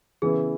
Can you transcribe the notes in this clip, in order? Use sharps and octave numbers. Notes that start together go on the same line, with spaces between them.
C#3 E3 B3 E4 G#4